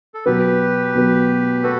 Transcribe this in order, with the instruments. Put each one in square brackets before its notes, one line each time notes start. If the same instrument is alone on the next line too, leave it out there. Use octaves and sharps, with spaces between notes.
[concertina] A4
[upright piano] B2 F#3 B3 [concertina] G4 B4
[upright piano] B2 F#3 B3
[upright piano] B3 [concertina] F#4 A4